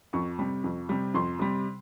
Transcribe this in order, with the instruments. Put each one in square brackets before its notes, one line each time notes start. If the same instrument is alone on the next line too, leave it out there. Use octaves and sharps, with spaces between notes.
[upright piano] F2 C#6
C3 G3
F2
C3 G3
F2 C6
C3 G3